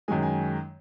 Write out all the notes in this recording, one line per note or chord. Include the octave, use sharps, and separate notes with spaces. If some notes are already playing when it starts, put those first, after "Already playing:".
F#2 D#3 G#3 G#5
G#5